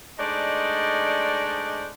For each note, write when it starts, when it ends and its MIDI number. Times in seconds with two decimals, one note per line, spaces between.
0.19 1.89 56
0.19 1.89 57
0.19 1.89 62
0.19 1.89 63
0.19 1.89 72
0.19 1.89 74